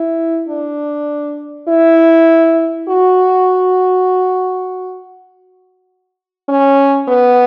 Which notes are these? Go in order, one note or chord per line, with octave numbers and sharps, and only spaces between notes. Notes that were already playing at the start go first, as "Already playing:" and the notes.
Already playing: E4
D4
E4
F#4
C#4
B3